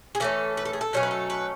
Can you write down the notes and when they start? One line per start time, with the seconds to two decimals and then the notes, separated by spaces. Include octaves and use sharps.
0.15 G#4
0.20 E3 A3 C#4 A4
0.57 B4
0.65 A4
0.73 G#4
0.81 A4
0.93 B2 F#3 A3 C#4 C#5
1.03 B4
1.11 A4
1.30 B4